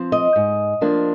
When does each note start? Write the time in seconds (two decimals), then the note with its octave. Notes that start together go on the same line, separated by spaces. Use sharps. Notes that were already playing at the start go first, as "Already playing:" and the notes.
Already playing: F3 C4
0.12 D#5
0.36 G#2
0.81 F3 A#3 D4